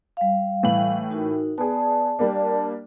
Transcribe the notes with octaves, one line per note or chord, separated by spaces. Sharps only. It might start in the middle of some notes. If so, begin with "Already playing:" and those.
G3 F5
A2 E3 F#7
D#4 F#4 A#4
B3 G#4 D5 A5
G3 A#3 D4